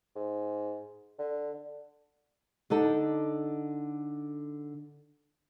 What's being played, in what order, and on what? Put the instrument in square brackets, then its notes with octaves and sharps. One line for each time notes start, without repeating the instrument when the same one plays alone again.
[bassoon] G#2
D3
[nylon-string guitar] D3 D4 D#4 A4